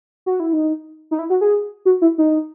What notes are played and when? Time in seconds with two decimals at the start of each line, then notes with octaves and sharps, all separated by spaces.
0.26 F#4
0.40 E4
0.53 D#4
1.11 D#4
1.19 E4
1.30 F#4
1.41 G#4
1.85 F#4
2.02 E4
2.18 D#4